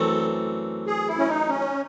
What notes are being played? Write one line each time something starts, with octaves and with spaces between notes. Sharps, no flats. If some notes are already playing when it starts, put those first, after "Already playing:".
Already playing: F#2 E3 A3 C4 A4
G#4
E4
C#4
D#4
C#4